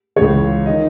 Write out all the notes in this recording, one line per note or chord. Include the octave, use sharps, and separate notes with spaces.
C#2 C#3 E3 C#5
D#3 D#5